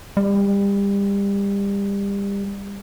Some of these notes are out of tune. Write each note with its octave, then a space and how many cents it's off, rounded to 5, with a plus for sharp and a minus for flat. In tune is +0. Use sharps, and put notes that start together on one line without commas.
G3 +30